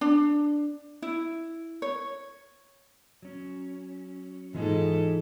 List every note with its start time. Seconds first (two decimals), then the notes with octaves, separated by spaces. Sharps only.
0.01 D4
1.02 E4
1.82 C#5
3.22 F#3 C#4
4.54 G#2 E3 F4 G#4 A4